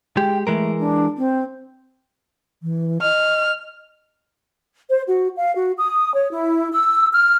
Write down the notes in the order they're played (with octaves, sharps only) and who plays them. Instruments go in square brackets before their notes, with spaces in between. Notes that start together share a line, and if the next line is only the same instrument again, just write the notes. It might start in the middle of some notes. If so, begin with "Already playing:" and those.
[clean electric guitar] G#3 G4 [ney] G5
[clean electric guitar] E3 G#3 A#4 [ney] A3
[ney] D4
C4
[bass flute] E3
[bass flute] D#5 [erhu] F6
[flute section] C5
F#4
F5
F#4
D#6
C#5
E4
E6
F6